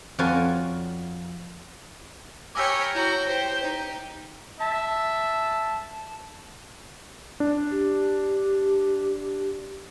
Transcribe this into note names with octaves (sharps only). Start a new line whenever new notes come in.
F2 F4 F#4 C#5 D5 G#5
G4 A#4 C#5 G#5 B5 D6 E6 G6
E4 F#4 C#5 G5 A#5
G4 C5
D#4
E5 A5
D4
G4